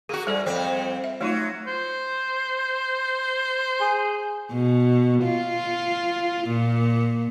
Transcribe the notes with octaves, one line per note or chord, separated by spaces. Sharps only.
A#3 F#4 G#4
G#2 G3 A4 D5
F2 C4
E5
F#3 A3 D#4 F4
C5
G#4
B2
F4
A#2